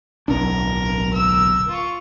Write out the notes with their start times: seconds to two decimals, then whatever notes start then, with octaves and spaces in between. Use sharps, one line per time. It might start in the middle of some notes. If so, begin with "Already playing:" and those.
0.28 D1 B1 D4 A#4
1.13 A#4 E6
1.68 F4 C#6